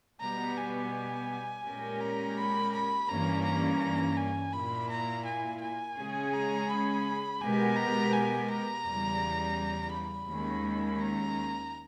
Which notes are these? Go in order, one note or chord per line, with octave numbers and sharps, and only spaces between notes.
B2 G3 B3 G4 A#5
G#5
A#2 G#3 C#4 G4 A#4
A#5
B5
B5
G2 E3 G3 A#3 C#4 A#5
A#5
G#5
A#2 A#3 E4 B5
A#5
G#5
G#5
C#3 G#3 C#4 G#4
A#5
B5
B2 G#3 B3 G4 A#4 G#5
A#5
G#5
A#5
E2 C#3 G3
B5
D#2 D#3 G#3 C#4
A#5